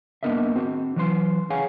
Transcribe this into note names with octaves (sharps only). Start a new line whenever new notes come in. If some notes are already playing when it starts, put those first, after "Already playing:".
A#3 B3 D4 A#4 D#5 E5
C4 F#4 C5
E3 F#3 B4 D#5 C6
G#4 C#5 F5 F#5 G#5